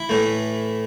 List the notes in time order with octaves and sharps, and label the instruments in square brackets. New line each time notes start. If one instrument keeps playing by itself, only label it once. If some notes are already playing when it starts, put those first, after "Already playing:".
Already playing: [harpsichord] E4
A2 E3 A3